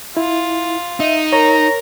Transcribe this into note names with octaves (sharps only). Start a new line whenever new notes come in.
E4 F4
D#4 E5
A#4 C#5 A#5